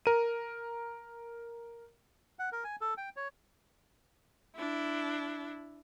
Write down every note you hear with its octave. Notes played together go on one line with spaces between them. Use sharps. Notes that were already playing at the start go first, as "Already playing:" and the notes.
A#4 D#7
F#5
A#4
G#5
A4
G5
C#5
D4 E4